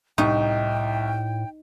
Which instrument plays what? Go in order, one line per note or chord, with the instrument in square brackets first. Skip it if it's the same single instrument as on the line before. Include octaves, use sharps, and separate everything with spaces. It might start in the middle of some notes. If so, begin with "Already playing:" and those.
[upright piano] C2 C#6 [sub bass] A2 [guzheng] D#4 [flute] G5